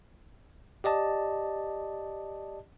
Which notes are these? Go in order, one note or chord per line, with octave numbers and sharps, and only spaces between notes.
G4 D5 D#5 A5